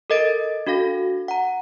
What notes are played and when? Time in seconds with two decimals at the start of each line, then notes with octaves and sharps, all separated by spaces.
0.10 A4 A#4 D#5 A6 D7
0.67 D4 F#4 A4 F5 A#6
1.28 F#5 A#5